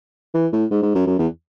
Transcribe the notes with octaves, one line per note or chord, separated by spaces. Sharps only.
E3
A2
G#2
G#2
F#2
F#2
E2